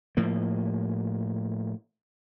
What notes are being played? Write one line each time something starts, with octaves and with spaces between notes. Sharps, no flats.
A2 F3 A#3